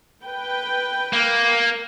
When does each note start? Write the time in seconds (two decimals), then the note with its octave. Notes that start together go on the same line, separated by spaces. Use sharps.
0.24 B4 G5
1.13 A#3